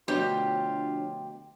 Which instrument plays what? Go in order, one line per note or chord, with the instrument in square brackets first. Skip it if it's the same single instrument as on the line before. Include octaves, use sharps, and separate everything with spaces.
[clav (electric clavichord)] D2 B2 [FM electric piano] F3 D4 C#5 [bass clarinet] F4 [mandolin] G4